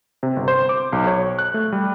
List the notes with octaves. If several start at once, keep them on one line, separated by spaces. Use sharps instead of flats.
C3
G1
C5
D6
B1
C#5
F#6
A3
G3